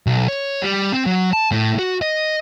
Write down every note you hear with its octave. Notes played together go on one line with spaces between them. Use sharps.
B1
C#5
G3
C4
F#3
A5
A2
F#4
D#5